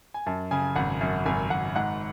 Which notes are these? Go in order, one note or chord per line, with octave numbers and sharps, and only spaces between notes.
G#5
F#2 A5
C#3 G#5
G#1 F#5
F#2
G#1 G#5
G#1 F#5
G#2 F#5